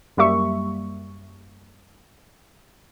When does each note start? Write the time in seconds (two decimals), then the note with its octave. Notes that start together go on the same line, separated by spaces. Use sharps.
0.17 F#2 G3 A#3 G4 E5 C#6